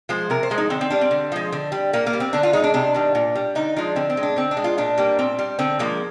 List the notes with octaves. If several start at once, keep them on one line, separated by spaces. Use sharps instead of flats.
F3 G#3 C5
C3 A#4
C5
F3 G#3
D#4
D3 C4
C4
G3 D4
C4
D3
F3 G#3
D3
G3
A#2 A#3
A#3
G3
C4
D3 D4
F4
G#3 D#4
D4
C3 D4
D#3 G3
A#2
G3
D3 D#4
F3 G#3 D4
D3 C4
C4
G#3
D4
D3 C4
D4
G#3
F4
A#2 D4
G3 A#3
A#2 C4
G3
D3 C4
F3 G#3 A#3